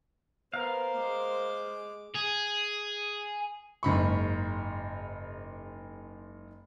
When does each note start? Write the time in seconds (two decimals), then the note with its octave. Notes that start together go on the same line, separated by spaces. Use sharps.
0.54 B3 A#4 C5 F5
0.96 G#3 D6
2.15 G#4
3.83 F#1 G#2 B5 C#6